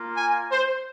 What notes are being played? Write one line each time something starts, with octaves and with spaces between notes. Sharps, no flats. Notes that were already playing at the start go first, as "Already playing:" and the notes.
Already playing: A#3 F4
G#5
C5